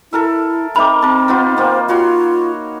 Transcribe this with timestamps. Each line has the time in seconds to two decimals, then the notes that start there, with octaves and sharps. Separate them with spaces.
0.13 E4 A4 A#4 E5
0.76 C4 D#4 A#4 E5 B5 D6
1.02 C4 A#4 A5
1.28 B3 D#4 F4
1.58 A#3 C4 C5
1.89 F4 F#4 C#5 C6